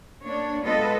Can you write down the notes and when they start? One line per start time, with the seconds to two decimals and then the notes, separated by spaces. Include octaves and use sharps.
0.24 A#3 D4 C#5
0.64 G#3 B3 F4 A4 B4 D#5